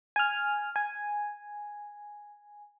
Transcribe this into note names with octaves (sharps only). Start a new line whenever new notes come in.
G#5 F6
G#5